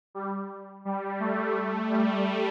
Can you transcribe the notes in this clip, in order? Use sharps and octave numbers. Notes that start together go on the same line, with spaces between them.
G3
G3
A3
A3
G3